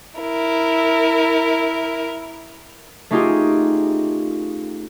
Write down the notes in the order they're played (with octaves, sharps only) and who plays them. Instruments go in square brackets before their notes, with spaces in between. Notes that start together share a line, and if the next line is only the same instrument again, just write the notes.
[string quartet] E4 A#4
[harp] A3 C#4 D#4 F4 G4 G#4